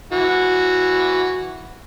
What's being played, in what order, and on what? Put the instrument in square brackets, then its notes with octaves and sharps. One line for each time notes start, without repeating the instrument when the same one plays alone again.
[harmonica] E3 F#4